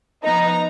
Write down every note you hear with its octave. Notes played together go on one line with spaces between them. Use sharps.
F3 B3 D#4 A#5